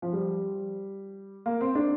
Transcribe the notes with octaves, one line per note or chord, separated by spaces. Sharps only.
F3
G3
A#3
C4
D4